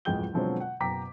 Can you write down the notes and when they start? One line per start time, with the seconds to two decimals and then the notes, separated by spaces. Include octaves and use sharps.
0.05 D1 F2 G#3 G5 G6 G7
0.33 B2 D3 F3 F#3 G#3 C4
0.60 F#5
0.80 F#1 B2 G5 A#5 D6 B6